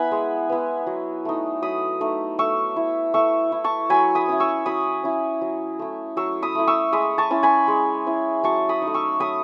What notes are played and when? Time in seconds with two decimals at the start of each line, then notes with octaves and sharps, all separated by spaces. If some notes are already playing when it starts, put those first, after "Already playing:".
Already playing: B3 E4 F#5 G#5 B5
0.12 G#3
0.49 B3 E4
0.87 F#3
1.25 A3 D#4
1.62 F#3 B5 D#6
2.01 A3 D#4
2.38 A3 C#6 E6
2.76 E4
3.14 A3 C#6 E6
3.52 E4
3.64 A5 C#6
3.90 F#3 G#5 B5
4.15 B5 D#6
4.28 C#4 E4
4.40 C#6 E6
4.66 F#3 B5 D#6
5.03 C#4 E4
5.41 F#3
5.79 A3 E4
6.17 F#3 C#6 E6
6.42 B5 D#6
6.55 A3 E4
6.67 C#6 E6
6.93 G#3 B5 D#6
7.18 A5 C#6
7.31 C#4 E4
7.43 G#5 B5
7.68 G#3
8.07 C#4 E4
8.44 F#3 A5 C#6
8.69 B5 D#6
8.82 D#4
8.87 A3
8.94 C#6 E6
9.20 F#3 B5 D#6